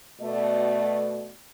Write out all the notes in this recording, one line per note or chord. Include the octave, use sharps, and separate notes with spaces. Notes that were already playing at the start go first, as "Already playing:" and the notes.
B2 A3 D5